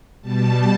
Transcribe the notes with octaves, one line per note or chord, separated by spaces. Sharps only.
B2 G3 A5